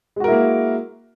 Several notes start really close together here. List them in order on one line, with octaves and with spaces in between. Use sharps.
G#3 F#4 A#4 E4 A#3